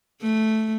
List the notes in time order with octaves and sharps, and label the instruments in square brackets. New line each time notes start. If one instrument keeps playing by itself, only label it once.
[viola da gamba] A3